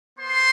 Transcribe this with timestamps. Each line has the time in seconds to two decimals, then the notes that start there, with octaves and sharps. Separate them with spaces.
0.18 B3 C5 C6